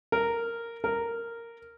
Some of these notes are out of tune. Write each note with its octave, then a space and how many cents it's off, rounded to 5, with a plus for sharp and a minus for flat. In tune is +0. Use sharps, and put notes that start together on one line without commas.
A#4 -10
A#4 -10